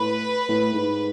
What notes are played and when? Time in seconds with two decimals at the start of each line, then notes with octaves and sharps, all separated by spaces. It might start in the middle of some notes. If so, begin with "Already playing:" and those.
Already playing: A2 B4
0.49 A2
0.73 G#2